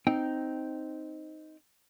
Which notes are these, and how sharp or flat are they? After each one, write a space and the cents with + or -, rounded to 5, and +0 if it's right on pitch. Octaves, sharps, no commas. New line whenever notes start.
C4 +0 D#4 +0 G5 -10